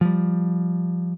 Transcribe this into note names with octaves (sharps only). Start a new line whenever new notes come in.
F3 G3